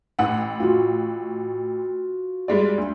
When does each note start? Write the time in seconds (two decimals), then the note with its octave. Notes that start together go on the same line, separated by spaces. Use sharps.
0.19 A1 F#5
0.60 F4 F#4
2.48 G3 G#3 D5
2.78 D2